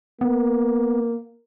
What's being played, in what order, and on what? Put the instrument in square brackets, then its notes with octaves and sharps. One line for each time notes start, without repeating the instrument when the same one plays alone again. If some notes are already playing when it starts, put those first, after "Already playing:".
[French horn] A#3 [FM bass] B3